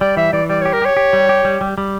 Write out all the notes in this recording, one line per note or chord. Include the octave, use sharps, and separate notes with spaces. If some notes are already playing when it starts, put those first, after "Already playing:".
G3 D5
E3 E5
E3 D5
G3 D5
G4 C#5
A#4
G4 C#5
G4
G3
G4
G3
G3
G3